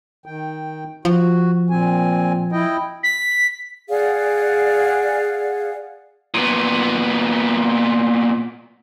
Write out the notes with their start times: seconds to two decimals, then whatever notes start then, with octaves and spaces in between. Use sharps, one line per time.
0.26 D#3 G5
1.05 F3 F#4
1.70 A#2 C4 G#5
2.52 E4 D#5 G5
3.03 B6
3.89 G#4 D5 F5 F#5
6.34 A#2 B3